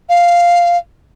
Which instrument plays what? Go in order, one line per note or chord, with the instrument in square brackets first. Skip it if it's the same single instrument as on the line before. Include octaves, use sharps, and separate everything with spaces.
[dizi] F5